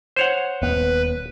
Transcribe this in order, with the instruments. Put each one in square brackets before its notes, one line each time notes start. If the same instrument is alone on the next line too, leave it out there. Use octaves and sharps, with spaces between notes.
[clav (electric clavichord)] C5 C#5 F#5
[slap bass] D#1 B3 [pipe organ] B4